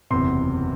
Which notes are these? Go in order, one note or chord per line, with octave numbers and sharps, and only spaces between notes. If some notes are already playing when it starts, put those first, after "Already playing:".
F#1 E2 C3 C6